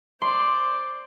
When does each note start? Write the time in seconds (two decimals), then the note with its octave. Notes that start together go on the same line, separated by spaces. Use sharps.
0.22 C5 D5 C6